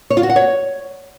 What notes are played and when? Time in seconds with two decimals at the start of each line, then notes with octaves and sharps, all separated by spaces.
0.10 C#5
0.17 F4
0.23 F#4
0.30 F#5
0.36 C#5